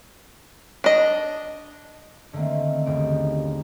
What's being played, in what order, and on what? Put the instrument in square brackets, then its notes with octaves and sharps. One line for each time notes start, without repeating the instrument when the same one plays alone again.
[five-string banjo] D4 D#5
[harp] D3 D#3 A3 A#3 C4
G1 D#2 C#3 D4 D#4 D7